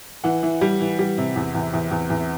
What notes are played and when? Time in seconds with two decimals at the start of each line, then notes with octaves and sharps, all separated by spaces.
0.24 E3 F#5
0.43 E3
0.61 G3
0.80 E3
0.99 G3
1.18 C3
1.36 E2
1.55 E2
1.73 E2
1.91 E2
2.10 E2